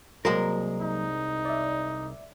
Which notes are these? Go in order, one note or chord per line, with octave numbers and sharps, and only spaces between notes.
C2 F#3 G#3 A#3 A#4
D#4
D5 E5